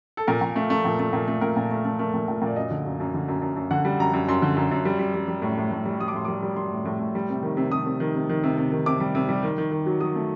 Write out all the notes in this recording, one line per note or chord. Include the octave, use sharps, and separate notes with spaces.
A4
A#2 A#4
A#2
A3
A3
A#2
A3
A#2
A3
A#2 A#4
A#2
A3
A3
A3 A#4
A#2
A#2
A#2 D5
F#2 D#5
D3
F#2
F#2
D3
F#2
F#2
F#2
D3 F#5
G3
F#2 A#5
F#2
F#2 C6
D3
F#2
F#2
G3
G3
G3
G3
A2
A2
A2
G3
G3 D#6
D6
A2 C6
G3 D6
G3
G3 C6
A2
A2
A2
G3
C3
D#3
C3
C3 D#6
C3
D#3
C3
D#3
C3
C3
D#3
C3 D6
G3
C3
G3
D#3
D#3
D#3
F#3
F#3 D#6
A3